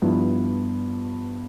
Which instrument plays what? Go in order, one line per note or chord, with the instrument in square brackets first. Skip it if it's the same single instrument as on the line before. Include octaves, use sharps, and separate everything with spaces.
[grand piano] G2 F3 B3 E4